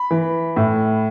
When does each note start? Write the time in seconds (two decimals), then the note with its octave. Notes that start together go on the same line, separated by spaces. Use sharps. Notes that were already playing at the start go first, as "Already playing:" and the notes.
Already playing: B5
0.11 E3
0.56 A2